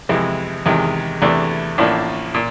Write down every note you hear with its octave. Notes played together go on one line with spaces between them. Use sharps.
F2 C3 E3 G#3
E2 C3 D#3 G#3
E2 C3 E3 A3 D4
A1 A2 F3 A#3 D4
A#2